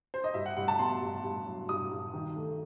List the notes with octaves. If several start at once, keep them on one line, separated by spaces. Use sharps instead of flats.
C5
D#5
G2 E5
F#5
G2 F#5
A5
B3 C6
G2
G2
F#3
G2 D#6
G2
D#3
A3